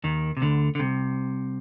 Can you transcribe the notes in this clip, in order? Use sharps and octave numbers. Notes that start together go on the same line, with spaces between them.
D#2 D#3
C3
D2 D3
D3
C2 C3